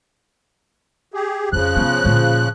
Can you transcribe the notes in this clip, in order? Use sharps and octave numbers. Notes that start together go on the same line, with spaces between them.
G4 G#4
F2 C#3 F3 C#4 F#6
C3 B3
A#2 D3